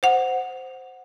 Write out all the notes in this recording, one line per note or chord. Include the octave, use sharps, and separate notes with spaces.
C5 F#5